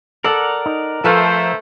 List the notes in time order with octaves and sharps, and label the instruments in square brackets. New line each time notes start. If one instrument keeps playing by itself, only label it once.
[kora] A4 [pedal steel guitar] A#4 D5 F#5
[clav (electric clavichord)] D#4
[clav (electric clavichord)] F3 F4 [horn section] A3 C5 [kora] A4 B4 F5